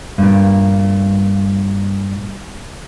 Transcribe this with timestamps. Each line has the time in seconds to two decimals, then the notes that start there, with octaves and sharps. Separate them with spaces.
0.18 G2 A#2